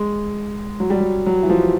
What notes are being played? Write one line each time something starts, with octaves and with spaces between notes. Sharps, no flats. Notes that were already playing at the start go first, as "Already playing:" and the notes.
Already playing: G#3
F#3
G3
F#3
F#3
E3
F3